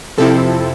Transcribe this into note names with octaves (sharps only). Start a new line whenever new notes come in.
F2 C3 F3 C4 E4 A4